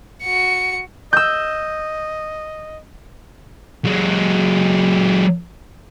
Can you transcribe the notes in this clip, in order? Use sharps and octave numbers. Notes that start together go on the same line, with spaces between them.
F#4 C#7
D#5 E6 G6
F#3 G#3